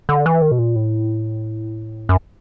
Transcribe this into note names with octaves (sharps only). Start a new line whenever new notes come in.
D3
E3
D#3
B2
A#2
A2
F#2